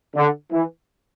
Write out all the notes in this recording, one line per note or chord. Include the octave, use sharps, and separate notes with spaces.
D3
E3